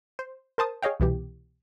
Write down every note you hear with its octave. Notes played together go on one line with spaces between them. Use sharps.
C5
A#4 C5 A5 D#6
G#4 C#5 D#5 F5 G5
C2 B2 E3 G4